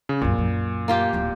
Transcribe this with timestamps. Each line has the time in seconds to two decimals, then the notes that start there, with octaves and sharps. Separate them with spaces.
0.09 C#3
0.21 C2 F#2 A#2
0.38 F#2
0.88 A#3 F4 G4
1.13 D1 E4